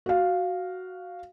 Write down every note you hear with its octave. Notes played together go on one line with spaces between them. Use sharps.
F#4 F5